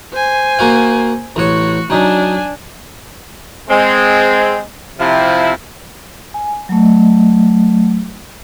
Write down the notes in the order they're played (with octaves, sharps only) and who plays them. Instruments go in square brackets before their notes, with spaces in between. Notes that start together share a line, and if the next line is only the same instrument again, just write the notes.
[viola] C5 G#5
[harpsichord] A#3 F#4 F5
[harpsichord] A1 C#5 [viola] F#4
[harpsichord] F#3 D#4 [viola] D4 G#5
[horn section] G#3 C4
C3 F3 E4
[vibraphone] G#5
F#3 A3